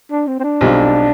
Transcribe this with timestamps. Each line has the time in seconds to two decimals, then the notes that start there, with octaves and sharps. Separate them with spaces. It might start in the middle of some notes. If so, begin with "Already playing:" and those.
0.11 D4
0.27 C4
0.39 C4
0.44 D4
0.61 B1 B2 G3 C4 F4